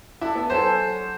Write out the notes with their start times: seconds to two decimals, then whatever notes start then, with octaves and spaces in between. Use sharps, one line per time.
0.21 D4 E4 A4
0.35 B3
0.50 F#3 A4 C5 G#5